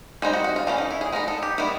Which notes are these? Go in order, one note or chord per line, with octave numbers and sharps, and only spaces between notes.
G3 C4 D#4 G#4
F#4
F#4
F4
E3 A3 C#4 F4
D#4
E4
G#4
G#3 B3 D#4 A#4
A4
G4
D#3 G3 B3 E4